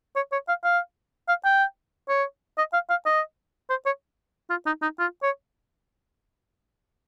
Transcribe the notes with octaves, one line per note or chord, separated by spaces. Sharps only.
C#5
C#5
F5
F5
F5
G5
C#5
D#5
F5
F5
D#5
C5
C#5
F4
D#4
D#4
F4
C#5